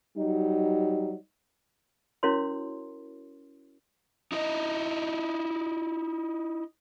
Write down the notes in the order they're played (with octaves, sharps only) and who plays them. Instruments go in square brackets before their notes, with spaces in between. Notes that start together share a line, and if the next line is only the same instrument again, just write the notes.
[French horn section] F#3 G3 D#4
[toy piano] C#4 E4 F#4 A#4 C#5 C6
[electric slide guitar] D#4 E4 A4 D#5